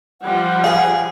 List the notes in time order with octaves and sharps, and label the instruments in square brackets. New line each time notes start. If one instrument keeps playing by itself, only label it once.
[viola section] F3 G3 [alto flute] F#5
[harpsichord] G#4 [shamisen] F5